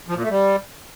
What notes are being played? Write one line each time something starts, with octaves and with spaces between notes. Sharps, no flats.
F3
A#2
A3
G3